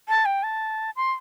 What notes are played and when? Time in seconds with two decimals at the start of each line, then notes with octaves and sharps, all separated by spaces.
0.09 A5
0.25 G5
0.43 A5
0.96 C6